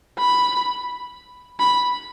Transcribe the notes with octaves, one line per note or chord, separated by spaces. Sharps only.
B5
B5